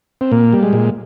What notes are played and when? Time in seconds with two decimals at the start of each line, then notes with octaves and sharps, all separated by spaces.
0.21 C4
0.31 A#2 A#3
0.53 G3
0.63 G#3
0.73 A#2